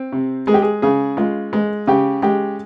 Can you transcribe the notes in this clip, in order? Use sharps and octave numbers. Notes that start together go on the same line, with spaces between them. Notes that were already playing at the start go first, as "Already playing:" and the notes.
Already playing: C4
C3
G#3 G#4
G4
G#4
C#3 G#4
G#3 F4
G#3
C#3 G4
G#3 G4